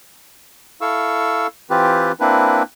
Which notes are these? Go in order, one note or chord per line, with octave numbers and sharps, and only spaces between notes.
E4 A4 F5 C#6 E6
E3 C4 F4 G4 B4
A#3 C4 D4 E4 B4